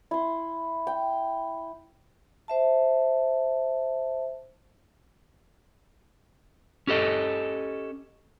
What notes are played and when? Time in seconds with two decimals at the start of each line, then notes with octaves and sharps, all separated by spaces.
0.11 E4 C6
0.87 G5
2.48 C5 E5 A5
6.87 C#4 G4 A4 D#5